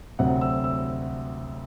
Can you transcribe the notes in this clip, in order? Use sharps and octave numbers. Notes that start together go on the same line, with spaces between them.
D2 C3 F#3 C4 F#5
E6
E6